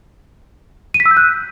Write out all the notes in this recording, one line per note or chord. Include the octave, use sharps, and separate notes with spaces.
D#7
B6
E6
G6
F#6